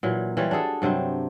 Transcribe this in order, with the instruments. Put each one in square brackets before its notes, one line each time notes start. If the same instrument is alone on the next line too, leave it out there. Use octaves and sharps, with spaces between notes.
[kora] A#2 E3 F#3
E3 G3 F4 C#5
D4 F#4 G#4 A4
G2 C3 F#3 C4